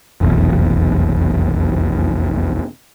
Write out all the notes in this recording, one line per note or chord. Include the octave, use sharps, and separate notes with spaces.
F1 B1 E2